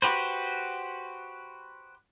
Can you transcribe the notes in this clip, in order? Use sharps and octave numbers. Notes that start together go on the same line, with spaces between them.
F#4 G4 B4 C5